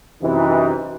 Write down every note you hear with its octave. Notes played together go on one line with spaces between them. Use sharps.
F#2 C3 E3 D#4